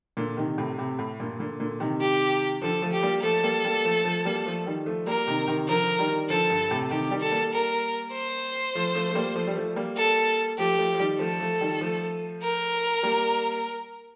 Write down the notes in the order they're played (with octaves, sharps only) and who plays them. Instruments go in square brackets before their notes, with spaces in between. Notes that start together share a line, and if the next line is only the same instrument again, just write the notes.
[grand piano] A#2 D3
C3 D#3
A2 C3
A2 C3
A2
G2 A#2
A#2 D3
A#2 D3
C3 D#3
[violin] G4
[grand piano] D3 F3 [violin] A4
[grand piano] F3 A3
[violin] G4
[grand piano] G3 A#3
[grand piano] F3 A3 [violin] A4
[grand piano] G3 A#3
G3 A#3
F3 A3
F3 A3
G3 A#3
F3 A3
D#3 G3
F3 A3
[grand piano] G3 A#3 [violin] A#4
[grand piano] C3 D#3
C3 D#3
[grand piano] D3 F3 [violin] A#4
[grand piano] D#3 G3
[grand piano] D3 F3 [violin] A4
[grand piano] G2
A2 C3
[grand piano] C3 D#3 [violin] G4
[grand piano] D#3 G3
[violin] A4
[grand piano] G3 A#3
[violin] A#4
C5
[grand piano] F3 A3
F3 A3
A3
G3 A#3
F3 A3
G3
F3 A3
G3 A#3
[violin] A4
[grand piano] F3 A3 [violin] G4
[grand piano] F3 A3
F3
D#3 G3
[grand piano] F3 A3 [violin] A4
[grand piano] F3 A3
D#3 G3
F3 A3
[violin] A#4
[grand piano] G3 A#3